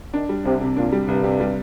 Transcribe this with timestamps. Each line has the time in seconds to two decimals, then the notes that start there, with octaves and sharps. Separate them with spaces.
0.14 D#3 D4
0.29 G3
0.45 C2 C3
0.61 C3
0.77 A#2 D4
0.92 G3
1.08 C2 G2
1.24 C3
1.40 G3